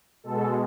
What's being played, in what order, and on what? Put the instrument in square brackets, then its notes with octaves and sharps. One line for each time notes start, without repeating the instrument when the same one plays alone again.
[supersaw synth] B2 G#3 A4